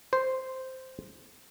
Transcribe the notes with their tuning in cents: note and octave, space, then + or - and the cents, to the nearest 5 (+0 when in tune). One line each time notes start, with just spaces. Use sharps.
C5 -5